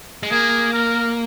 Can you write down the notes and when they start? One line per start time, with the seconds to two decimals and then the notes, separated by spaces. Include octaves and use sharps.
0.23 G#3
0.32 A#3 G#4
0.73 A#4